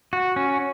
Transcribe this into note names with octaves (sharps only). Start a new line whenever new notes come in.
F#4
C#4